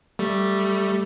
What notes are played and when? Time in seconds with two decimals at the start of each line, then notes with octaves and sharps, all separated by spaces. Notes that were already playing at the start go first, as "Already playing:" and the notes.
0.19 G3 A3